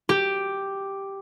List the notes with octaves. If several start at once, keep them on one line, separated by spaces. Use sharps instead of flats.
G4